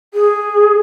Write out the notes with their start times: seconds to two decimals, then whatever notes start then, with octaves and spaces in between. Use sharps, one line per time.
0.14 G#4